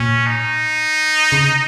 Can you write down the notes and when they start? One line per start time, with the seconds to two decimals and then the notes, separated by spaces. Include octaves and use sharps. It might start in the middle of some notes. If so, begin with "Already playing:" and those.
Already playing: A#2 C#4
0.27 D#4
1.32 C#3